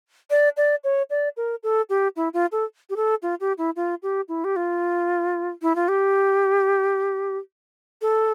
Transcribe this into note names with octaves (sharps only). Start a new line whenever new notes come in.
D5
D5
C#5
D5
A#4
A4
G4
E4
F4
A4
G4
A4
F4
G4
E4
F4
G4
E4
G4
F4
E4
F4
G4
A4